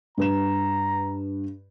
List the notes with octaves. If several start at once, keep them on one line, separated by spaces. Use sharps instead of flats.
G2 B4 A#5 E7